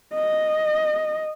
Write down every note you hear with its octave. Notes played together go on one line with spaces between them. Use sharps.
D#5